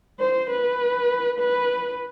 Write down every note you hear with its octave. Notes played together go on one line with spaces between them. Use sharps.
C5
B4
B4